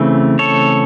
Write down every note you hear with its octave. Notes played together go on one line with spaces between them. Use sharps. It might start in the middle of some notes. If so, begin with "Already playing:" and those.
Already playing: C#3 E3 A3 C4
A4 C#5